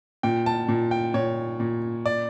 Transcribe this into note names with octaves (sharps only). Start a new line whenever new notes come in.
A#2 G5
A5
A#2
G5
A#2 C#5
A#2
D5